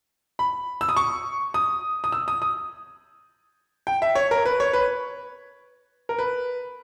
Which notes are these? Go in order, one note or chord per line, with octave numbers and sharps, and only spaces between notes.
B5
E6
D#6
C#6
D#6
D#6
E6
D#6
D#6
G5
E5
C#5
A#4
B4
C#5
B4
A#4
B4